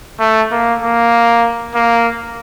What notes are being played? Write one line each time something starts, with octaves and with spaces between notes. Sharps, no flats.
A3
A#3
A#3
A#3